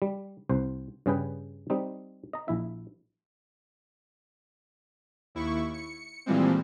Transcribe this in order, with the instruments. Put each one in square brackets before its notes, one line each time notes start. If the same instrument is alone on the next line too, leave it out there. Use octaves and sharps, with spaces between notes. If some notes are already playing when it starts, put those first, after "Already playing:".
[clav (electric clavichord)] G3
C2 C5
G2 C#3 G#4 B4 G5
G3 C4 D#4
D#5 A#5
A#1 E4 E5
[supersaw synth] D#2 E4 C#6
C#7
A#2 E3 F3 G3 G#3 C4